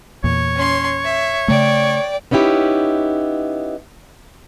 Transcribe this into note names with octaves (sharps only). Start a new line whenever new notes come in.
E2 A#2 C#5
C#4 C6
E5
C#3 A3 D5 G5
B3 C#4 D#4 E4 G4